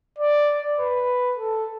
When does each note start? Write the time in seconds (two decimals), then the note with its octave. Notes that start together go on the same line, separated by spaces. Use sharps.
0.19 D5
0.79 B4
1.37 A4